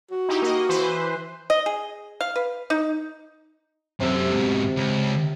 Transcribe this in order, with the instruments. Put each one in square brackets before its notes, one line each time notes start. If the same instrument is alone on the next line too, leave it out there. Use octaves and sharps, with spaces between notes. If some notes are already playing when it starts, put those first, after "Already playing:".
[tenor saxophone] F#4
[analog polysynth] D#4 E4 G4
A#3 D#5
E3 B4 C5
[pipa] D#5
G#4
F5
B4
D#4
[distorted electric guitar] F#2 A4 [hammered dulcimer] C3
[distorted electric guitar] G#2 B2
C#2